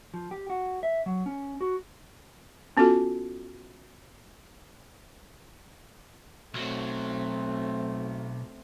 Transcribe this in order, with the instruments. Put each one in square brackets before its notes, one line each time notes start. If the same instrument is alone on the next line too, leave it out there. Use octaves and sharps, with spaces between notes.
[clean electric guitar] F3
G4
F#4
E5
F#3
C#4
F#4
[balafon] B3 C#4 F4 F#4 A4
[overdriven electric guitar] B1 F#3 [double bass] A3 C4